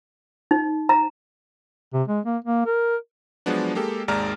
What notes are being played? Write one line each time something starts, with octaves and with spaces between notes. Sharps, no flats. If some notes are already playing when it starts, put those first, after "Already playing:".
D#4
A#5
C3
G#3
A#3
A#3
A#4
F3 F#3 G#3 B3 D4
G#3 A#3 G4 A4
G#1 D#2 G#3 D5 A#5 F6